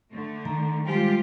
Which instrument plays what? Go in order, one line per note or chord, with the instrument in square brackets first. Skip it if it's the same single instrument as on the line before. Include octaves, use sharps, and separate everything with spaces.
[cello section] D3 A3
[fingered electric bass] D#3 [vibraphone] A#5
[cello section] F3 F4 G4 [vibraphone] G3 G#3